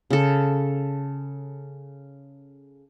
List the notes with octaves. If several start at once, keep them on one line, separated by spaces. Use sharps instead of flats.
C#3 A4